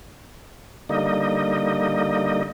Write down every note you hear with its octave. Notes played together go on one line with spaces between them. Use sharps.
D3 G3 A#3 D#4 D#5